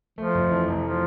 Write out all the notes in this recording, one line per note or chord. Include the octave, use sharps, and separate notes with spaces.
F3 A3
F2
E3
F1
F3